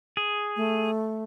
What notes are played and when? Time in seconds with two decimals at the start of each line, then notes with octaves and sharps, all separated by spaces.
0.17 G#4
0.56 A3